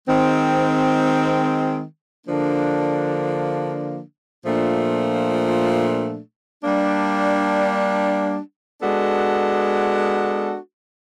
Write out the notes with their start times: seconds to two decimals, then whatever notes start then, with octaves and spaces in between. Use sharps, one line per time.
0.08 D#3 G#3 C4
2.27 D3 F3 A#3 D4
4.45 A#2 F3 A3 D4
6.64 G3 A#3 D4
8.82 G#3 B3 D4 F#4 A4